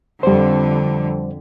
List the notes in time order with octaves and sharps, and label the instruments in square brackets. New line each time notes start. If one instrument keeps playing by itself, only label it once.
[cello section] F2 D3 [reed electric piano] G3 C5